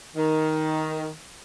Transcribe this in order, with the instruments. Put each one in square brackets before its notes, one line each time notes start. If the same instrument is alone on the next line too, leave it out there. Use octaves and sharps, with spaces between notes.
[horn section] D#3